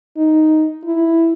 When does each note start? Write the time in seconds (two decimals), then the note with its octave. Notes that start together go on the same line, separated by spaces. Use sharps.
0.17 D#4
0.84 E4